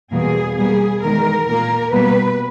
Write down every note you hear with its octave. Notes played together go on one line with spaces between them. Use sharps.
E2 B2 G3 A#3 G#4
B2 G3 A#3 G#4
E2 D#3 G#3 A#4
A#2 A#3 A#4
B2 G3 A#3 B4